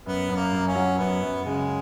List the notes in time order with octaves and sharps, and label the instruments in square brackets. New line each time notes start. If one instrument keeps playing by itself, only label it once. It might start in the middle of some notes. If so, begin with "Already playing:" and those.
[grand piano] F#2 [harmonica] B3
[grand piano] F#2
[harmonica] A#3
[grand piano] F#2
[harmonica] C#4
[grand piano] F#3
[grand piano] F#2 [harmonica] B3
[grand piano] F#2
[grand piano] C#3 [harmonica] G#3